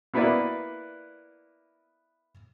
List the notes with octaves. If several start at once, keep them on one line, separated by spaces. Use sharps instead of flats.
A#3 B3 E4 B4 D5